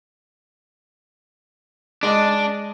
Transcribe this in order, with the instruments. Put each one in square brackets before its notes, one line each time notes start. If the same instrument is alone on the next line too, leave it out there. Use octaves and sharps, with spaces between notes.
[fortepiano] G#3 D#5 D6 [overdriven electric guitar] D4